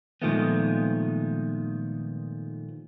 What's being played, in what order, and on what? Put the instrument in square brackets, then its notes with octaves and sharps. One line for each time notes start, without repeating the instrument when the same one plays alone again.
[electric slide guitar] A#2 D#3 F3 G#3 A3 B3